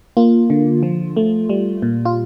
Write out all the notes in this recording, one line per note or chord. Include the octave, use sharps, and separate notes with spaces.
A#3 F4
D3
F3
A3
G3
A#2
F4